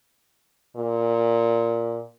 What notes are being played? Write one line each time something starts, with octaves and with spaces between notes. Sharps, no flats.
A#2